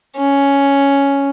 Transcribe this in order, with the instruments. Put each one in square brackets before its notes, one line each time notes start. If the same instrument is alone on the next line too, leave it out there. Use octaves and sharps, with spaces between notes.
[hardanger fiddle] C#4